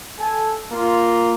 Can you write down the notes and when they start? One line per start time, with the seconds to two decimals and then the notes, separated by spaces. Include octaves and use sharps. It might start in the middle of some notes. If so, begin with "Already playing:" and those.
0.18 A4 G#5
0.71 A#3 F4